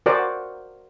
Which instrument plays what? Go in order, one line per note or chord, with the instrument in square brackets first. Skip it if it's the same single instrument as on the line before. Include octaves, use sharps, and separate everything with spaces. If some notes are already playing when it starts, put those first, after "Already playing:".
[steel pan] F#4 A#4 C5 D5